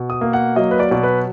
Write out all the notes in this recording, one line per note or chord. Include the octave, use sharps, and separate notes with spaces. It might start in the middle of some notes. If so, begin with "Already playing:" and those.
Already playing: B2
D#6
A#3
F#5
F#3 D#5
B4
D5
B2 D5
B4